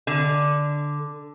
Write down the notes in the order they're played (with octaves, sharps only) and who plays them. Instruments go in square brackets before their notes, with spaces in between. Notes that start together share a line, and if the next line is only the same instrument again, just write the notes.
[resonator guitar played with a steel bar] D3